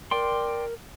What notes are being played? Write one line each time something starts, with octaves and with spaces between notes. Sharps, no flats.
A#4 D5 G5 C6